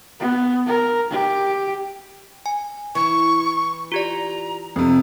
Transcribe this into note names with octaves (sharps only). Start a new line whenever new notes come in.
B3
A#4
G4
G#5
E3 C#6
F4 G4 D5 A#5
F2 C3